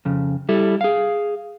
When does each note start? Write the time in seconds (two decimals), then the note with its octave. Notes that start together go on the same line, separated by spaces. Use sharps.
0.05 F2 C#3
0.49 G3 E4 A4
0.81 G#4 F5